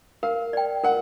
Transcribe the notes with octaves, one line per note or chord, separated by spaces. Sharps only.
A#4 F5
D5 G5
A#4 F#5